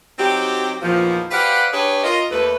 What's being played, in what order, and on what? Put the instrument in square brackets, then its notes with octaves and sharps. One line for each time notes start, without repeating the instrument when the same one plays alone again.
[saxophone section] F#3 C4 D#4 G4
E2 A#2 D#3 F3
G4 B4 C5 D5 F5 F#5
D4 G4 G#4 B4 C#5
F4 A#4 D#5
D#2 A3 B4